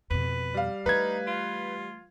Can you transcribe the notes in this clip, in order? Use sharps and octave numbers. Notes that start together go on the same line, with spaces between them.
F2 B2 B4
G3 F5
E3 A3 D#4 B4 G#6
F4